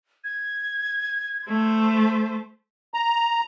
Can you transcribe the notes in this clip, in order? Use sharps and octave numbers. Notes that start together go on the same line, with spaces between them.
G#6
A3 C5
A#5